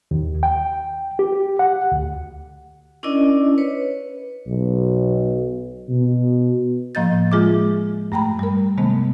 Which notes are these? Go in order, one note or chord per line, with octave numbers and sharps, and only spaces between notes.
D#2
G5
G4
F#5
D2
C#4 D4 E4 A#4 D5 D#5
B4 C#5
B1
B2
A2 F3 A#3 D#5 G6 A6
G#3 F4 G#4 E5 D6
G2 A3 G5 A#5 B5
G3 A#4
C3 D#3 G#3 A3 B3